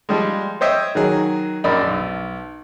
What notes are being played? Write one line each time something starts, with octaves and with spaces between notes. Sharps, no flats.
F3 G3 G#3
C5 C#5 D#5 E5 G5
D#3 F#3 G#4
A#1 F#2 D5 D#5 B5
B1